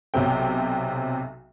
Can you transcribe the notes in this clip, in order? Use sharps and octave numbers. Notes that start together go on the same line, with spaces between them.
B1 C3 F#3 C4 G5